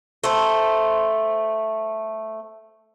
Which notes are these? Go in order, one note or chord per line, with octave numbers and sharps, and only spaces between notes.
A3 C5